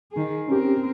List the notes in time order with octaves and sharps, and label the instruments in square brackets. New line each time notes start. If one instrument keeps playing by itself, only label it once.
[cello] D#3 G#4
[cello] C4 A#4 [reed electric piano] C#4 G4